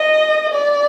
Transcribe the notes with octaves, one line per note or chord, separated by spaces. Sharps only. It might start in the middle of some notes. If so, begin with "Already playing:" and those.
Already playing: D#5
D5